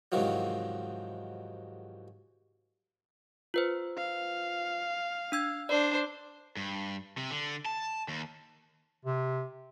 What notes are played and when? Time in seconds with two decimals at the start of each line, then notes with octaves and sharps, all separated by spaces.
0.12 E2 G#2 C3 D#3 F3 F#3
3.54 F4 B4 C5
3.98 F5
5.32 D4 E6 G#6
5.69 D4 C5 D5
6.57 G2
7.18 C3
7.31 D3
7.66 A5
8.08 D#2
9.05 C3